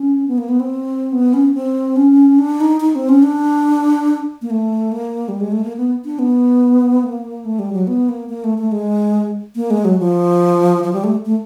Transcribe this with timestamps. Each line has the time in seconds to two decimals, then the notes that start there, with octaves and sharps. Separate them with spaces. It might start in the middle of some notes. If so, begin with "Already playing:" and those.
Already playing: C#4
0.28 B3
0.38 A#3
0.49 B3
0.60 C4
1.12 B3
1.34 C#4
1.54 C4
1.96 C#4
2.39 D4
2.60 D#4
2.81 D#4
2.95 C4
3.09 C#4
3.23 D4
4.42 A#3
4.50 A3
4.92 A#3
5.28 G3
5.40 G#3
5.52 A3
5.64 A#3
5.77 B3
6.05 D4
6.19 B3
7.04 A#3
7.45 A3
7.59 G3
7.73 F#3
7.87 B3
8.09 A#3
8.29 A#3
8.44 A3
8.58 A3
8.72 G#3
9.56 A#3
9.71 G#3
9.85 F#3
9.99 F3
10.84 F3
10.93 G3
11.04 A3
11.26 A3